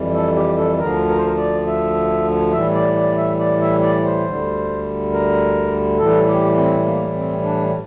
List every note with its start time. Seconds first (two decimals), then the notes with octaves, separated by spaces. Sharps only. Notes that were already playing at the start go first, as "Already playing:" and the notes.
Already playing: F2 E3 G3
0.14 A4
0.36 G4
0.57 A4
0.79 D2 D3 F3 A#4
1.09 A#4
1.16 C5
1.25 A#4
1.37 D5
1.66 E5
2.52 A2 E3 G3 E5
2.74 D5
2.95 D5
3.17 E5
3.39 D5
3.61 E5
3.82 D5
4.05 C5
4.26 D2 D3 G3
5.13 A#4
5.99 A2 E3 G3 A4
6.28 G4
6.56 C4
6.85 A#3
7.14 C4
7.43 D4